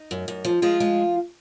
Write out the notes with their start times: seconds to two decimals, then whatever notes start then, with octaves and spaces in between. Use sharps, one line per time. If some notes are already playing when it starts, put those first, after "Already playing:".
Already playing: D#4
0.11 F#2
0.28 F#2
0.45 F3
0.62 F3 G#3 F4
0.80 G#3